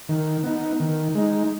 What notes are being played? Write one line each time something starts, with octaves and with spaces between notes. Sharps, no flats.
D#3
B3 D#4
D#3
G#3 D#4